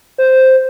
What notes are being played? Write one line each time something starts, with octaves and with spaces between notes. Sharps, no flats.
C5